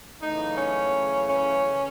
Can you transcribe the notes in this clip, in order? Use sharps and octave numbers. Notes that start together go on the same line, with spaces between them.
F#2 C#3 E3 A3 D#4
C#4
C#4